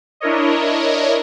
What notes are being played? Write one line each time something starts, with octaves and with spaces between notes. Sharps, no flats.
D4 E4 A#4 C#5 D#5